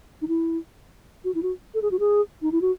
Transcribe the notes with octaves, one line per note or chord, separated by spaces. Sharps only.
D#4
E4
F#4
E4
F#4
A4
G#4
F#4
G#4
D#4
E4
F#4